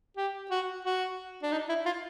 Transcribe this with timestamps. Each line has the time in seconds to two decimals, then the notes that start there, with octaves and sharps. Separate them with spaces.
0.17 G4
0.51 F#4
0.85 F#4
1.43 D4
1.52 D#4
1.69 E4
1.86 F4